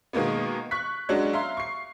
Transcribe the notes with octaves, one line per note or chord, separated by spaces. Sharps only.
B2 D#3 G#3 A#3 B3
C#6 F#6 B6
F#3 G#3 C#4 D4 F#4
E5 F5 A#5 C6
C#6 C7